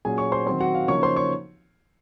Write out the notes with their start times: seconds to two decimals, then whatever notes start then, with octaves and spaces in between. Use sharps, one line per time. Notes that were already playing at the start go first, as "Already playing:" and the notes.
0.05 A#2 F#3 C#4 G#4 G#5
0.18 C#5 C#6
0.32 C5 C6
0.46 D#3 F#3 C4 C5 C6
0.60 F#4 F#5
0.75 F5
0.88 C#3 F3 A#3 D#4 C#5 C#6
1.03 C5 C6
1.16 C#5 C#6